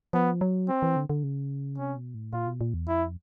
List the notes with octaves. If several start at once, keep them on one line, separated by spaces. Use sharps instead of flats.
F3 B3
F#3
C4
E3
D3
D3
C#3
C3 C#4
B2
A2
A#2 F4
B2
A#2
E2
F2 E4